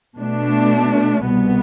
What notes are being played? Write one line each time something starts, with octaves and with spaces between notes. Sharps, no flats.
B2 A3 D4
C2 B2 B3